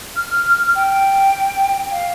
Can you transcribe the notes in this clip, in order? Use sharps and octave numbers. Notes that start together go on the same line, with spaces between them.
F6
G5
F5